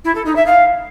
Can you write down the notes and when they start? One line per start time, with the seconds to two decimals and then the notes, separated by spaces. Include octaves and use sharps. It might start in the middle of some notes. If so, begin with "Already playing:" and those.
0.04 E4
0.15 A4
0.25 D#4
0.35 E5
0.46 F5